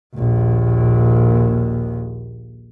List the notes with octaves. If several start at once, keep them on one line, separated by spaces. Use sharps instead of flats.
A#1 D#2